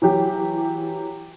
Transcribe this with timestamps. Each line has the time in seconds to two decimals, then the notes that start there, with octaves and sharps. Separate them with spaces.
0.02 E3 F#3 G4